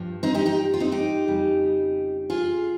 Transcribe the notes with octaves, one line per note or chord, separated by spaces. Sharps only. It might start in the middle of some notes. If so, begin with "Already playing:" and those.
Already playing: G2 F3
C4 D#4
D#4 G4
D#4 G4
F4
C4 D#4
D#4 G4
F2 C#3 G3
F4 G#4